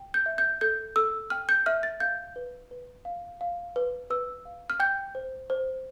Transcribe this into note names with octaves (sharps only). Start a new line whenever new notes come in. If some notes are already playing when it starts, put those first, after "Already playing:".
Already playing: G5
G6
E5
G6
A4 G6
A4 E6
G5 F6
G6
E5 F6
A6
F5 G6
B4
B4
F5
F5
B4
B4 E6
F5
F6
G5 G6
C5
C5